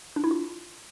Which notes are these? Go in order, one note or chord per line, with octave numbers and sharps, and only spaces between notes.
D4
E4
F4